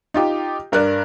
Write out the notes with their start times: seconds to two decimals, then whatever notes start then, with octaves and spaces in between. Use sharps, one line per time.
0.14 D#4 F4 G4
0.72 G2 A#4 D5 F#6